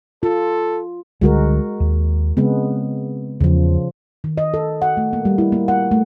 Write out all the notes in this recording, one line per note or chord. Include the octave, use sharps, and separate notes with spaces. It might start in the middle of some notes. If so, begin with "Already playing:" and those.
F4 A4
C#2 D3 G3 G#3 F#4 A#4
D#2
C#3 G#3 B3 C4
E2 C#3 F3
D#3
D#5
A4
F#5
A3
A#3
G3
E4
A#3
F#5
A3